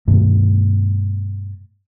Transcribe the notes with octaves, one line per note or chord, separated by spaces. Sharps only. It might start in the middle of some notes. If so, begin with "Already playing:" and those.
G2 B2 D#3 A3